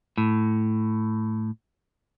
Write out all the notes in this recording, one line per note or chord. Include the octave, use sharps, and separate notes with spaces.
A2